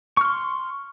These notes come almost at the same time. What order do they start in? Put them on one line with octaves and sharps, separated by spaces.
C#6 F6 C6